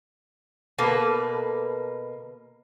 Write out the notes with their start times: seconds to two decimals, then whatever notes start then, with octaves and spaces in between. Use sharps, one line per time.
0.78 B2 A#3 A4 B4